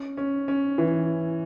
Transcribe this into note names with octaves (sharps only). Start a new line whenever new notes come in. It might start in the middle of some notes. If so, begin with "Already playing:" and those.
Already playing: C#4
C#4
C#4
E3